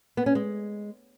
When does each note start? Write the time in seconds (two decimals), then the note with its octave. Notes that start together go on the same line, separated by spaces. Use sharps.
0.17 B3
0.26 C#4
0.35 G#3